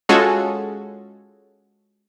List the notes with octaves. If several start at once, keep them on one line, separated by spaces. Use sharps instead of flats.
G#3 C#4 F4 F#4 G#4 A4